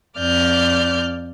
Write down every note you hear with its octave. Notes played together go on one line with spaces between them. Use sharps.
F2 D5 F6 G6